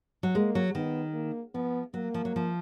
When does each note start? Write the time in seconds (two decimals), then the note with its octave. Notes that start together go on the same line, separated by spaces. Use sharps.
0.23 F#3
0.35 G#3 A#3
0.55 F#3
0.75 D#3 B3
1.14 A#3
1.54 F3 B3
1.94 F#3 A#3
2.14 F3
2.25 F#3
2.36 F3